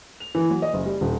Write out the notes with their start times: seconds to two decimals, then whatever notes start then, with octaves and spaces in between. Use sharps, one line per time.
0.20 F7
0.35 E3
0.50 F#3
0.62 D#5
0.74 F#1
0.86 G3
1.01 D#1